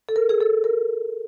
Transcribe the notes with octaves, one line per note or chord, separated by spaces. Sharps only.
A4
A#4
G#4
A4
A#4